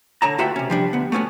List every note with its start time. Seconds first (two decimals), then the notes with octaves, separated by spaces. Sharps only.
0.22 D3 C#5 A5 A#5
0.38 D2 F4 F#4 B4 E5 G5
0.56 C3 C#4
0.70 F3 G3 D4
0.93 D2 B3
1.12 A3 B3 C#4 F#4